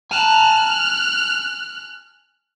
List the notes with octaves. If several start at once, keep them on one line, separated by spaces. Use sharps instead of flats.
G#5 A5 F6 F#6